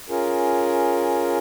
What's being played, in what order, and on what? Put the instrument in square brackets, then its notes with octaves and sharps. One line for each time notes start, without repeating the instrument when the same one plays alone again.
[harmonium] C#4 F4 G#4 A#4